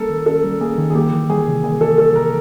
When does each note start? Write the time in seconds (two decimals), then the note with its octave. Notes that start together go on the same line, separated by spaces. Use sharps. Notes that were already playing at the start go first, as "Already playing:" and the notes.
Already playing: G3 A#3 C#4 A4 A#4
0.10 D#3
0.26 C#4 A4
0.44 G3
0.61 A#3 G#4
0.78 D#3
0.90 G#4
0.95 A#3 G4
1.13 E3
1.30 G3 G#4
1.47 C3
1.64 A#3 G#4
1.81 E3 A4
1.98 G3 A4
2.15 C3 A#4